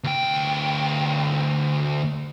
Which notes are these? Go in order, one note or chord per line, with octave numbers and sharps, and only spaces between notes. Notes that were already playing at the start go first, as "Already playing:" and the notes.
D2 G5